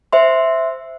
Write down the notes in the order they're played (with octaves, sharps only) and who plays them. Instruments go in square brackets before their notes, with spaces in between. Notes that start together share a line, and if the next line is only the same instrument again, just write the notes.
[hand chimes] C5 E5 C6